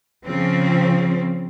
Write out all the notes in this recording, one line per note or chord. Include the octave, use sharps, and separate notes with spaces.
C#3 F3 C4